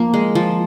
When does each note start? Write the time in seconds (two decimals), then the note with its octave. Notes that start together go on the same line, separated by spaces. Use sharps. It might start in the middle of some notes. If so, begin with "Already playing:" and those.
Already playing: F3 A#3
0.14 G#3
0.35 F3